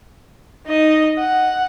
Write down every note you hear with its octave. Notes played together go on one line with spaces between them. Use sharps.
D#4 D#5
F#5